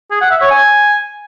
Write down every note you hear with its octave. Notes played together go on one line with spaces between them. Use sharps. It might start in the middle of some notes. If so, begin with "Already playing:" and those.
G#4
F#5
E5
C#5
G#5